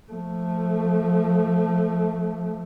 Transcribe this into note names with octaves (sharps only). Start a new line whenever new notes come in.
F3 A3